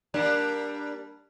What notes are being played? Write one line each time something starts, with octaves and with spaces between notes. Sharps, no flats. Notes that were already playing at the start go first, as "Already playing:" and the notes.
G3 A#3 D4